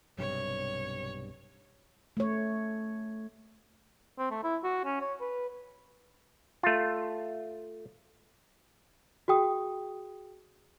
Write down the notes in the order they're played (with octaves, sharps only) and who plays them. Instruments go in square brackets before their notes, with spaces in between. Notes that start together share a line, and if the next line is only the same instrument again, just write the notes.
[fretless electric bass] B1 G2 C3 [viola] C#5
[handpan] A3 C#5
[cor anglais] C4
A3
E4
F#4
C#4
C#5
B4
[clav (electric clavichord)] A3 F4
[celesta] F#4 G#4 G5 D#6